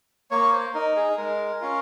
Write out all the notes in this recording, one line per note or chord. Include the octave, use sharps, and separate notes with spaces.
A#3 C#5
C5
D#4 A#4
G#4
G#3 A#4
C#4 F4